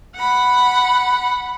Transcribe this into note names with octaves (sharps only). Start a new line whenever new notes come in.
F#5 B5